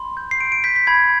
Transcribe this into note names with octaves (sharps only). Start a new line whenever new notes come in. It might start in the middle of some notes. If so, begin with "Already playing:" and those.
Already playing: B5 C6
G6
C7
C6 D7
D7
G6 B6
B6
B5 G#6